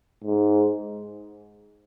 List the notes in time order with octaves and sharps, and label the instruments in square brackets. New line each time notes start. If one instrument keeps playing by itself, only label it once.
[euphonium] G#2